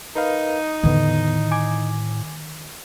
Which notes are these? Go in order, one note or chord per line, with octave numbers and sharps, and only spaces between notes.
D#4 A#4 B4 D#5 F5
E2 A2 D3 D#3 B3
G#5 D6 G#6